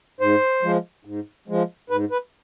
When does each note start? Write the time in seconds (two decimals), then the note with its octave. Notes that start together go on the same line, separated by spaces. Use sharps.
0.20 G#2 C5
0.63 F3 G#3
1.05 G#2
1.48 F3 G#3
1.90 G#2 B4
2.11 B4